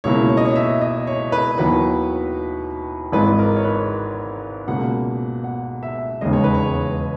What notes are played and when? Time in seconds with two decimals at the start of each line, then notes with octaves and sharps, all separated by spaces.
0.04 C#2 B2 A#3 E4 C#5
0.29 C#5
0.37 D#5
0.45 C#5
0.56 E5
0.81 D#5
1.07 C#5
1.32 B4
1.58 D#2 D#3 F#3 B3 E4 B4
3.12 G#1 G#2 E3 G#3 D#4 B4
3.39 A#4
3.56 C#5
3.65 B4
4.67 C#2 B2 A#3 F#5
5.44 F#5
5.83 E5
6.21 E1 D#2 C#3 G#3 D#5
6.33 C#5
6.44 B4
6.54 C#5